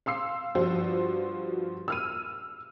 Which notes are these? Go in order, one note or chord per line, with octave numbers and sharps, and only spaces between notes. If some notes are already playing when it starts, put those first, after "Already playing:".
F5 C6 E6 C7
G2 F3 F4 F#4 C5
E6 F6 D#7